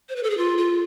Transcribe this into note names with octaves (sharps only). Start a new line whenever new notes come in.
C5
B4
A4
G#4
F4
F4